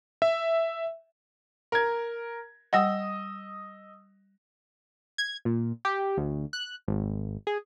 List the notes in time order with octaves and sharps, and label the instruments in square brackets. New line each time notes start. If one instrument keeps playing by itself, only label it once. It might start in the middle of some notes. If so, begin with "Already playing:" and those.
[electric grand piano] E5
[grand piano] A#4 G#6
[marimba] G3 F#5 [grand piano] D#5 D#6 E6
[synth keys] G#6
A#2
G4
D2
F#6
G#1
G#4